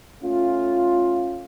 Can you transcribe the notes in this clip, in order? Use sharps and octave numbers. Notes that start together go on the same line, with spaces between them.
A3 C#4 F4